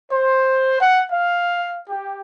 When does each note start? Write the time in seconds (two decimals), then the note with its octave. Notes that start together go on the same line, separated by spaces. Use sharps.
0.11 C5
0.80 F#5
1.10 F5
1.89 G4